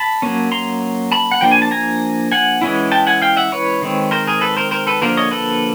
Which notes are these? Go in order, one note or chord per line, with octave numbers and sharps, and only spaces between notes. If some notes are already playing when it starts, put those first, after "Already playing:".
Already playing: A5 B5
F#3 A#3 C#4
A#5 C6
A5 B5
F#5
F3 A#3 D4 G5
G#5
A5
G#5 A#5
F#5 G#5
E3 G#3 C#4 E4
G5 A5
F#5 G#5
F5 G5
E5 F#5
B4 C#5
D#3 G#3 C4
A#4 C5
G#4 A#4
A4 B4
A#4 C5
A#4 C5
A4 B4
D3 F3 A#3 A#4 C5
C#5 D#5
A4 B4